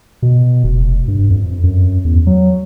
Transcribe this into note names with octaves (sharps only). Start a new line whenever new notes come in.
B2
F1
G2
F2
F#2
E2
F#3